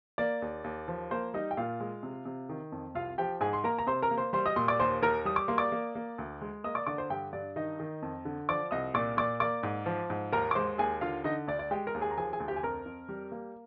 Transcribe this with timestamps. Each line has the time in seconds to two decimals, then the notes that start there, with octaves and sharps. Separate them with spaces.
0.18 A#3 D5
0.42 D#2
0.64 D#2
0.88 F3
1.11 A#3 C5
1.34 G3 D#4 D#5
1.51 G5
1.57 A#2 F4 F5
1.80 G#3
2.03 C3
2.25 C3
2.49 D#3
2.72 F2
2.95 C2 F4 F5
3.18 F3 G4 G5
3.41 G#2 G#4 G#5
3.53 C6
3.64 A#3 A#4 A#5
3.78 A#5
3.87 C3 C5 C6
4.02 A#4 A#5
4.11 A#3
4.17 C5 C6
4.33 G3 C5 C6
4.46 D#5 D#6
4.56 A#2 C6
4.68 D5 D6
4.80 D#2 C5 C6
5.02 D#2 A#4 A#5
5.25 G3 D#6
5.36 D6
5.48 A#3 C6
5.58 D5 D6
5.72 A#3
5.95 A#3
6.18 D2
6.41 G#3
6.64 A#3 D#5 D#6
6.75 D5 D6
6.87 D3 D5 D6
6.98 C5 C6
7.10 G2 G4 G5
7.33 G2 D5
7.56 D#3 D#4 D#5
7.80 D#3
8.02 F2
8.25 D3
8.49 F3 D5 D6
8.71 C2 D#5 D#6
8.94 A#2 D5 D6
9.17 A#2 D5 D6
9.40 A#3 D5 D6
9.63 G#2
9.86 F3
10.10 G#2
10.32 D#2 A#4 A#5
10.51 D6
10.55 G#3 C5 C6
10.78 D#2 G#4 G#5
11.01 D3 F4 F5
11.24 D3 D#4 D#5
11.47 D2 D5
11.59 D5
11.71 G#3 G4 G5
11.87 A#4 A#5
11.94 D#2
12.01 G#4 G#5
12.11 A#5
12.17 F3 G#4 G#5
12.33 G#4 G#5
12.40 D2
12.48 G4 G5
12.56 G#5
12.63 F2 A#4 A#5
12.86 F2
13.09 G3
13.32 A#3